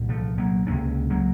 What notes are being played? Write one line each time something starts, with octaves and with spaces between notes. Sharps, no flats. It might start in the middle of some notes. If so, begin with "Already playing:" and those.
Already playing: C2 A#2
F3 A3
F#3 A#3
C#2 C3 A#3 C#4
F#3 A#3